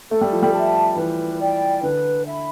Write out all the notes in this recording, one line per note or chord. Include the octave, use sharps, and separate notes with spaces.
A3 A4
G3
F3
G3
E5 A5
E3 B4
D5 G5
D3 B4
E5 B5